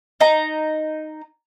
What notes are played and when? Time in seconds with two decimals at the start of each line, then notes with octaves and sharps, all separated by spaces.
0.20 D#4 A#5